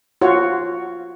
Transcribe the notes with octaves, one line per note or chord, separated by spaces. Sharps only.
F4 F#4 C#5